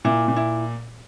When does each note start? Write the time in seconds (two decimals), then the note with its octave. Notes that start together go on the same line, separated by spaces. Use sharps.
0.05 A#2 E4
0.28 A#2
0.36 E4